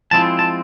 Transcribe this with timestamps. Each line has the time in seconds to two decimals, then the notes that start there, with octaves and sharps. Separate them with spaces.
0.11 F3 G#3 C4 E4 A5
0.39 A5